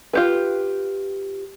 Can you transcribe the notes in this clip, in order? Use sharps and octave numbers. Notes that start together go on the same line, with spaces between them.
F4 G4 B4